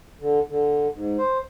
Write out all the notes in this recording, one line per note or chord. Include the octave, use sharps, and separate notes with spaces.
D3
D3
G#2
C5